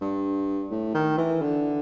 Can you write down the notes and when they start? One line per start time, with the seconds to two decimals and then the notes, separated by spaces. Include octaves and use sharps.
0.01 G2
0.71 A2
0.94 D#3
1.18 E3
1.42 D3